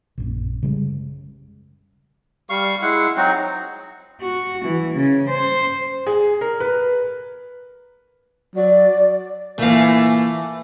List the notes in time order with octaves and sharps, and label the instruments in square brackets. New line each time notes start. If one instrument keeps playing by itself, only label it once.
[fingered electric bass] A#1 F#2
C#3 G3 G#3
[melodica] G3 F5 C#6
G#3 E4 F#5
F#3 C4 D#4 F#4
[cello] F#4
E3
C#3
C5
[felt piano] G#4
A#4
B4
[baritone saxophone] F#3 [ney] D5
[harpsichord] A#2 F5 [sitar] E3 A3